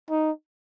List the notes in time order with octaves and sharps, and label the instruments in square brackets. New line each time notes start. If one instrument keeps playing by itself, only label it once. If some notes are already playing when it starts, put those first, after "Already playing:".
[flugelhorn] D#4